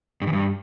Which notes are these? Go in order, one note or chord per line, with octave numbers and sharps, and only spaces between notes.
G2
E2
G2